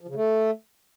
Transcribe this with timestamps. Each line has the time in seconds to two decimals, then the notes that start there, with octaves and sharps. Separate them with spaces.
0.01 F3
0.08 C#3
0.15 A3